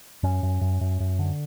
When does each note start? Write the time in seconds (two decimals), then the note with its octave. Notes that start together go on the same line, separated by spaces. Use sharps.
0.23 F#2 C#4
0.43 F#2
0.61 F#2
0.81 F#2
1.00 F#2
1.19 D3